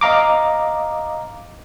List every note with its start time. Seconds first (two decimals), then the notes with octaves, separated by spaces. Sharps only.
0.01 D#5 F5 A#5 D6